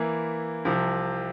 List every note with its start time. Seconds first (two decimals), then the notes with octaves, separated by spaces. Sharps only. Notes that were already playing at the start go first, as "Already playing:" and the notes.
Already playing: E3 A#3 E4
0.65 C2 C3 F3